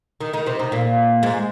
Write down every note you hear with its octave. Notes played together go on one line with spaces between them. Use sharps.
D#3 D#4
D#3 D#4
C3 C4
D#3 D#4
A#2 A#3
G#2 G#3